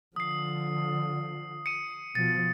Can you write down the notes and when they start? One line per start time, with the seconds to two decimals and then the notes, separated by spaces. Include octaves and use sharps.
0.16 D3 F3 D#6 C7
1.66 C#7 D#7
2.15 B2 F3 A6